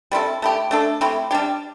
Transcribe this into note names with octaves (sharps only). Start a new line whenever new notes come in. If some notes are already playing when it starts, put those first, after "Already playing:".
G3 C4 E4 A4
A3 E4 G4
A3 D4 A4
A3 C4 E4 G4
G3 D4 G4